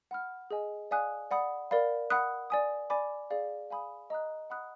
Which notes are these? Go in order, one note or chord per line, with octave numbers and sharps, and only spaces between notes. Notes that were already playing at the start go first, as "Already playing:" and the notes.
F#5 B5 F6
G#4 D#5 G#5
D5 F5 G#5 D#6 F#6
D5 F#5 B5 D#6
A#4 D5 F5 B5
F#5 B5 D#6 F#6
D5 G#5 D#6
D5 G#5 B5 D6
G#4 D5 F5
F5 G#5 B5 D#6
D#5 A#5 D#6 F#6
F#5 B5 D#6 F#6